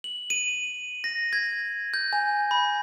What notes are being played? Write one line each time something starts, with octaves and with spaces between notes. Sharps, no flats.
F#7
D#7
A#6
G#6
G6
G#5
B5